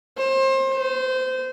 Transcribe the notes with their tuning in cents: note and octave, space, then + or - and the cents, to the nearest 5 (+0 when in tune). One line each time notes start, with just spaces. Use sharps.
C5 +30
C5 -25